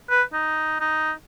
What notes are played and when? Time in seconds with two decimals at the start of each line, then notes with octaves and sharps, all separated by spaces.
0.10 B4
0.33 D#4
0.80 D#4